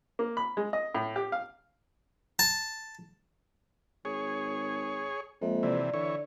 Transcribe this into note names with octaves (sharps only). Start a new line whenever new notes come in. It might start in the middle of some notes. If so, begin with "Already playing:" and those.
A#3
B5
G#3
D#5
A2
G4
F5
A5
G#1 G#4 C#5
F2 G#3 A#3 E5
C3 E3 D5
D3 E3 C#5